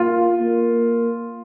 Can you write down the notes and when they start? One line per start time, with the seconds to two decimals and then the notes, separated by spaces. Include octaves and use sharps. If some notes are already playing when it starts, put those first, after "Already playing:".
Already playing: A#3 F4
0.40 A#3